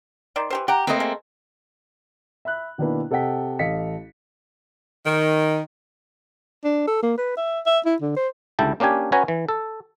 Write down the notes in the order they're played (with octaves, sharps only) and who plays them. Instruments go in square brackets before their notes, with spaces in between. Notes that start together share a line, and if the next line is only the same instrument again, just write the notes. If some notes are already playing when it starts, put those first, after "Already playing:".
[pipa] D#3 C5 D5
E3 G4 C5
[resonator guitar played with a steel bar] G4 [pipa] F#5 G5 A#5
[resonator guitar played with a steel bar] A3 A#3 C4 [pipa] B4 D#5
[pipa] G#3
[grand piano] E5 B5 F#6
B2 D#3 A#3 D4 E4 B4
C3 A4 D#5 F#5 G5 B6
A1 A4 D#5 F5 B6 C#7
[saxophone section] D#3
[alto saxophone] D4
A4
A#3
B4
E5
E5
E4
D3
C5
[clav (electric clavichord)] C#2 D3 G3 E4 G5 A5
A#3 C#4 D4 G4 G#5
C#4 F#4 B4 C#5 G#5 A#5
E3
A4